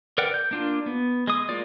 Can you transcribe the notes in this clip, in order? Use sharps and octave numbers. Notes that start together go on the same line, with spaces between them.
A#4 B4 D5 F#5 G5
G6
A#3 D4 F4
B3
G#3 D#6
G#3 A#3 F4 D5